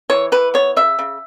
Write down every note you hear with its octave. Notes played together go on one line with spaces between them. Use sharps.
E3 C#5
E3 B4
B3 C#5
C#3 E5
C#3